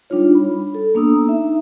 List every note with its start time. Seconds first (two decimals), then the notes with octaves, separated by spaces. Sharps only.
0.10 G3 D4 D#4 F4 C#5
0.35 B5
0.74 A4
0.95 A#3 B3 D4 A#5 D#6 E6
1.25 D#4 E5